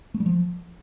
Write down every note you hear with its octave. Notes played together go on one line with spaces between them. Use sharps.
A3
G3
F3